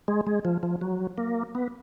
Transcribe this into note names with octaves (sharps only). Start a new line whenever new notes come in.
G#3
G#3
F3
F3
F#3
A#3
B3